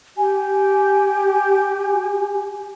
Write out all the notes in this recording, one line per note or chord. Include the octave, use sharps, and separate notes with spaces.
G4 G#5